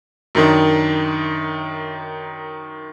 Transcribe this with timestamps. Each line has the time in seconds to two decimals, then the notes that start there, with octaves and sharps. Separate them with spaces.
0.35 F#2 D#3 D4